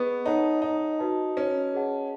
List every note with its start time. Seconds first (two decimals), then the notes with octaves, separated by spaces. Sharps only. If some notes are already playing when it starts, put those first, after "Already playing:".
Already playing: B3 G#4 B4 D#5 F#5 C#6
0.25 D#4 A4 C#5 F#5 A5
0.62 D#4
0.99 F#4 B4 D#5 A5
1.37 C#4
1.74 G#4 B4 D#5 F#5 A5